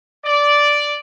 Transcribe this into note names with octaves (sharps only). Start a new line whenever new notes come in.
D5